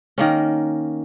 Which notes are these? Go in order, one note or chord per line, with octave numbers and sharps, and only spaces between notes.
D#3 A#3 C#4